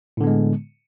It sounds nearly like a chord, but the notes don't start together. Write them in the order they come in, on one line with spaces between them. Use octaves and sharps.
A2 D3 B3 G#3